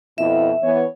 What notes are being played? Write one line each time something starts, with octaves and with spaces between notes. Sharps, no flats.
F2 B2 E4 E5
E3 B3 C#5